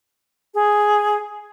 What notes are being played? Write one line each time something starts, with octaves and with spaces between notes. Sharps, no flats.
G#4